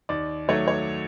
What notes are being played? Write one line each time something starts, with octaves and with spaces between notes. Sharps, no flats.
D#2 D5
D#3 F#3 A3 C#5
C#5